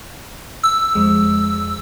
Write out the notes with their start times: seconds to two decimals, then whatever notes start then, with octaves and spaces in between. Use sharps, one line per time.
0.63 E6
0.95 F2 G#3